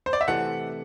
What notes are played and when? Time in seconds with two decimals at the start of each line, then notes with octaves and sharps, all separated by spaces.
0.06 C5
0.13 D5
0.21 E5
0.28 C3 E3 A3 F#5